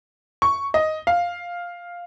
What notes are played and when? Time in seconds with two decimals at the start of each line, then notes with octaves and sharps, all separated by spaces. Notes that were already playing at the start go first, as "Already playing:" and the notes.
0.42 C#6
0.74 D#5
1.07 F5